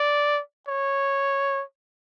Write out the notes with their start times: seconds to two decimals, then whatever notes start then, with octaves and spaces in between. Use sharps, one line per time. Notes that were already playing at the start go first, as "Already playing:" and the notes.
Already playing: D5
0.68 C#5